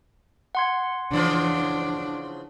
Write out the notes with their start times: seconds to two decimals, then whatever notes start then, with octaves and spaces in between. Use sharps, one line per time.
0.55 F#5 C6 G#6
1.11 C#3 E3 F3 D4